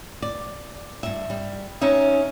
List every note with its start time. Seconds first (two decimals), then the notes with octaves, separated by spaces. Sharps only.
0.22 D5
1.03 G2 E5
1.30 G3
1.81 C#4 D#4 E5